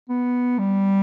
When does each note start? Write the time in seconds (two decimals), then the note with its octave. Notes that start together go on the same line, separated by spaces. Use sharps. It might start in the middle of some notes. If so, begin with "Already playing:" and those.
0.09 B3
0.59 G3